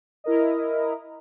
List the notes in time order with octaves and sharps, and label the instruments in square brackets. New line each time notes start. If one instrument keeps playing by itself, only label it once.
[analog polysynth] E4 A#4 D#5